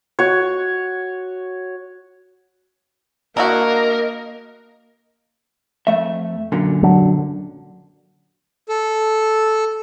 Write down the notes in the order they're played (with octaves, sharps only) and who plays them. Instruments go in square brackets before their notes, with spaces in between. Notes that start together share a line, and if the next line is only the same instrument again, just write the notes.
[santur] F#4 C#5
[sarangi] A#3 [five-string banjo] D4 E4 F#4 [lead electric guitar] A#4 [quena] D#5
[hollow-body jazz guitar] F2 A3 E5
F#2 A#2 D3
[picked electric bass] F#3 D4
[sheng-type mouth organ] A4